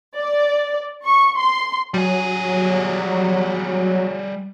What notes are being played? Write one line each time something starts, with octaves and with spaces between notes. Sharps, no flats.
D5
C#6
C6
F#3 G3 G#4